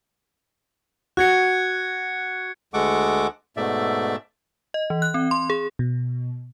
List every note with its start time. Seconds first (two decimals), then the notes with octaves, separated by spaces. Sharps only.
1.17 F#4 F#6 G#6 C#7
2.74 D2 G#3 A4 F#5 C#6 D6
3.57 G#2 B2 A3 D5 E5
4.74 D#5
4.90 E3
5.02 F#6
5.14 C4
5.31 C6
5.50 G#4
5.79 B2